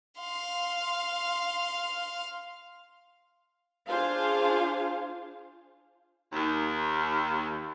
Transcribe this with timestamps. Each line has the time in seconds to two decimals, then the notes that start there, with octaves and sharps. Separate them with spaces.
0.20 F5 C6
3.87 D4 F4 G#4 C5 F5
6.32 D#2